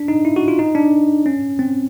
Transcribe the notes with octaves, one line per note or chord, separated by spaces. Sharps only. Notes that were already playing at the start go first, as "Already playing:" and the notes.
Already playing: D4
D#4
E4
F#4
F4
D#4
D4
C#4
C4